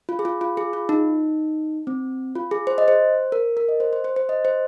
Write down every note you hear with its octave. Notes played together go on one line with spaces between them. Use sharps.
F4
G#4
F4
F4
G#4
F4
D#4
C4
F4
G#4
C5
D#5
C5
A#4
A#4
D#5
C5
C5
C5
C5
D#5
C5